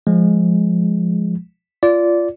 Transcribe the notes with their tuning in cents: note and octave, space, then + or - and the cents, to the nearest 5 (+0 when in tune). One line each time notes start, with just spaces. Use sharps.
F3 +0 G#3 +0
F4 -15 D5 -15